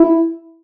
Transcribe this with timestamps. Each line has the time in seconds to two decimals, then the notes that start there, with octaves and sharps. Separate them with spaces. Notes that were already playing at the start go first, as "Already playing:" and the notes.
Already playing: E4